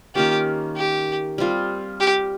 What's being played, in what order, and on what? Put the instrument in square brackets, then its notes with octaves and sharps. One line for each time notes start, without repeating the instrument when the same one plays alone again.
[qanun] D#3 A#3 C#4 F4 [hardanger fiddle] G4
[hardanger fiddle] G4
[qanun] G3 C4 F4
[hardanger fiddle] G4